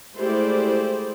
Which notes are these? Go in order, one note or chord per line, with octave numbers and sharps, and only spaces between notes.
G#3 A3 E4 G4 C5 D5